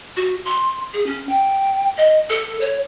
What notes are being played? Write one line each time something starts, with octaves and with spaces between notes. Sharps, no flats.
F#4
C6
G#4
C#4
G5
D#5
A4
C#5